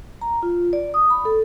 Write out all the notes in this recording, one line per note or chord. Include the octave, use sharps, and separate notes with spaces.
A#5
F4
D5
D#6
B5
A4